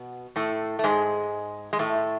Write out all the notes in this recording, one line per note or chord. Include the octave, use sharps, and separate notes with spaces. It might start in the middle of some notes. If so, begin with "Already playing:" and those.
Already playing: B2 B3
A2 A3
A3
G#2 G#3
G#3
A2 A3